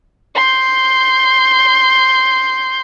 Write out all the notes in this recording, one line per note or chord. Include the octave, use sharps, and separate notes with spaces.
C6 G6